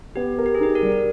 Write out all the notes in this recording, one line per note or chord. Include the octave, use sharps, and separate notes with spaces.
B3 G4
A#4
G4
G#4
D#4 G4
A#4
G3